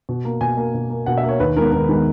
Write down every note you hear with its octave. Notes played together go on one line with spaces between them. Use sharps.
B2
A#3
B2 G#5
A#3
B2
A#3
B2 F#5
E5
A#3
C#5
D#2 B4
D#3 G#3 B3 A#4
D#2 A#4
D#3 G#3 B3